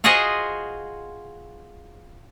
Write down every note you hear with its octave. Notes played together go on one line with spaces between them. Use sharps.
F4 F#4 G#4 C5 D#5